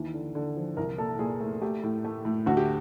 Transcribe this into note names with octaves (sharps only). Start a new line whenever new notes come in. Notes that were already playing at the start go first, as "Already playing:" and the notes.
Already playing: D#2 E3
D3
D3
F3
C2 A#4
A#2 A4
A#2 G#4
A3
A3 G4
A2
A3
A2
D2 F#4
G4